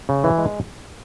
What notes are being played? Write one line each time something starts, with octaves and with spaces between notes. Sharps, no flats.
C#3
E3
G#3